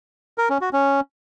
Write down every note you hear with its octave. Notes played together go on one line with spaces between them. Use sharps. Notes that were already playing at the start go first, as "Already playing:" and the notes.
A#4
C#4
F#4
C#4